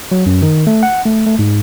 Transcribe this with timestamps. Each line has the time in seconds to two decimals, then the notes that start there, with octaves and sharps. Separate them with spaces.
0.11 F#3
0.26 F#2
0.42 D#3
0.67 A3
0.83 F#5
1.06 A3
1.27 A3
1.39 G#2